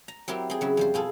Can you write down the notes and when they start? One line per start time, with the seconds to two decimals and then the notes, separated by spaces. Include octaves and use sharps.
0.08 A#5
0.28 F#3 C4 E4 G4 A#4
0.50 C4 G#4
0.61 C#3 F#3 E4
0.77 F2 G3 C5
0.94 B2 F4 G#4 A4